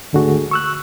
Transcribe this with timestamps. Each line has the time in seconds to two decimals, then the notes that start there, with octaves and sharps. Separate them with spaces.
0.13 D2 G#2 D3 A3 F#4 G#4
0.51 C#6 E6 F#6